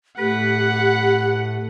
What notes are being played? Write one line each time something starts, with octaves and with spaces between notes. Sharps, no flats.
A2 A3 G4 B4 F#5